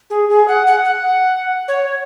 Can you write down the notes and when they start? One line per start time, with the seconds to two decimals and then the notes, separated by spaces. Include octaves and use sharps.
0.10 G#4
0.29 G#4
0.48 F#5
0.67 F#5
0.85 F#5
1.68 C#5